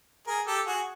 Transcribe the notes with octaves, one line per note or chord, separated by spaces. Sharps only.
G#4 A#4
G4 A4
F#4 G#4